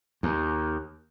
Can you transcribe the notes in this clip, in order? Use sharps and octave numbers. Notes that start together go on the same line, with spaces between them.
D#2